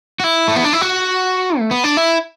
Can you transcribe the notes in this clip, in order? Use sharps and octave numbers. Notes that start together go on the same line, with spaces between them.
F#4
E4
A3
B3
D4
E4
F#4
A3
B3
D4
E4